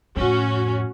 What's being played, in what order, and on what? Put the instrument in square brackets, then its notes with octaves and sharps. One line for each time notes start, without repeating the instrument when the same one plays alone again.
[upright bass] F2 A2 [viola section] C#4 F#4